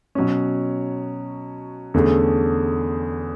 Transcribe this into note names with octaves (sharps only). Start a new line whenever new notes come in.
B2 F#3 C#4
E2 D3 A3 C#4 G#4